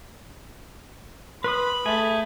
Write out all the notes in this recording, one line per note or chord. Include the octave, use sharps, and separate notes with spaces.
B4 B5 C6 D#6
A3 G#4